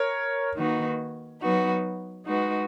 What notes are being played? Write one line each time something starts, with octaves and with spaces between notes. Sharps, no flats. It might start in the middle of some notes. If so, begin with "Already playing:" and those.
Already playing: A#4 C#5
D#3 A#3 D#4 F#4 B4
F#3 B3 D#4 F#4 B4
G#3 D#4 F#4 B4